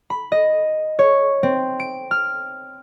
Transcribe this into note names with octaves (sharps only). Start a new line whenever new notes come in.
B5
D#5
C#5
C4
D7
F6